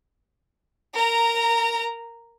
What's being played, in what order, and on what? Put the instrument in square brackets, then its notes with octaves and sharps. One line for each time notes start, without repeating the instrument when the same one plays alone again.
[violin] A#4 A#5